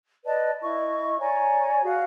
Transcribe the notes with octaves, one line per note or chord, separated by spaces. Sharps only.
B4 D5 D#5 A5
E4 D#5 C#6
C#5 D5 G#5 A#5
F#4 G#4 F5